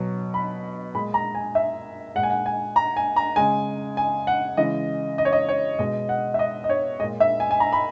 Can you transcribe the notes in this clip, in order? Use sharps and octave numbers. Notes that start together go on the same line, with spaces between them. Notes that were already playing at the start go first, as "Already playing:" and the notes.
Already playing: B2 F#3
B5
A#2 G#3 B5
A#5
G#5
E5
A#2 G#3 F#5
G#5
F#5
G#5
A#5
G#5
A#5
C#3 G#3 G#5
G#5
F#5
C#3 E3 G#3 D#5
D#5
C#5
D#5
C#5
B2 G#3 D#5
F#5
E5
D#5
D#5
C#5
A#2 G#3 D#5
E5
G#5
G#5
A#5
B5